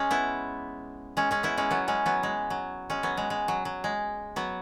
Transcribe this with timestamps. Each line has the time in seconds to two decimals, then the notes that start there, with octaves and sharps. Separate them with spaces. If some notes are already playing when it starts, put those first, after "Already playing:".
Already playing: G#3 C#4
0.11 B3 E4
1.17 G#3 C#4
1.31 G#3 C#4
1.43 B3 E4
1.57 G#3 C#4
1.70 F#3 B3
1.88 G#3 C#4
2.06 F#3 B3
2.23 G#3
2.50 F#3
2.90 G#3 C#4
3.03 F#3 B3
3.17 G#3
3.30 G#3
3.48 F#3
3.65 F#3
3.84 G#3
4.36 F#3 B3